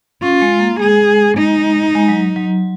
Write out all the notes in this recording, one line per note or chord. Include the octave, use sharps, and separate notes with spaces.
C#4 F4
G#3
A#3
G#3 G#4
D#4
G#3
F#3
F#3